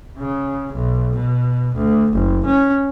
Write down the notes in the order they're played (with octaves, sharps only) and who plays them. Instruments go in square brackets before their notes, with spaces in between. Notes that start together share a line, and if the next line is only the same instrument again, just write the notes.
[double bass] C#3
B1
B2
D2
F#1
C#4